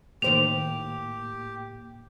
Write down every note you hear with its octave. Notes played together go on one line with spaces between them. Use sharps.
A2 D#3 A#3 G4 C5 D7 F7